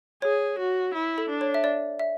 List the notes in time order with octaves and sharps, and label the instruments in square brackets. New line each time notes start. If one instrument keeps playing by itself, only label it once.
[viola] G#4 [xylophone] C#5
[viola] F#4
E4
[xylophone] A4
[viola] D4
[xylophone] C#5
E5
D5
E5